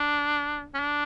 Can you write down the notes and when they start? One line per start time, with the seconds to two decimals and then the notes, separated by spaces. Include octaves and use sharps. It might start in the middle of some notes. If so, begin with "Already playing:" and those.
Already playing: D4
0.75 C#4
0.80 D4